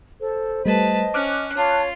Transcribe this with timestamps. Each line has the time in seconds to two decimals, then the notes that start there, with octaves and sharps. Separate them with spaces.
0.21 A4 C5
0.66 G3 A3 B4 D#5 A5
1.14 C#4 D6 F6 F#6
1.57 F4 C#5 A5